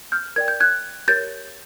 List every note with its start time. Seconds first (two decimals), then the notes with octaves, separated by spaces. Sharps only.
0.12 F6 G6
0.36 A#4 D5 G5 G#6
0.48 G6
0.60 F#6 G#6
1.08 G4 A#4 C#5 G6 A6